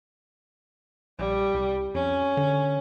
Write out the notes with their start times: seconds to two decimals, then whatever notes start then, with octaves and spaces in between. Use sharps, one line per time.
1.19 A#1 G3
1.54 C2
1.94 F2 C#4
2.37 D3